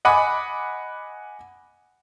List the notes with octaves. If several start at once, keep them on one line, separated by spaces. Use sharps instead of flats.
D#5 F#5 G#5 B5 D6